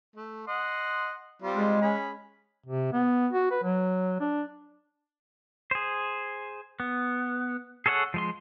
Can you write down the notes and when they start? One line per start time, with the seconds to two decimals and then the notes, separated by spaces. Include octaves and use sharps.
0.16 A3
0.47 D#5 F#5 C6
1.42 G3 C4 F4
1.56 G#3
1.82 C#4 G#4 B5
2.66 C3
2.93 B3
3.33 F#4
3.51 B4
3.63 F#3
4.20 D4
5.71 G#4 C5
6.80 B3
7.86 G#4 A4 C#5 E5 F#5
8.14 F3 G#3 C6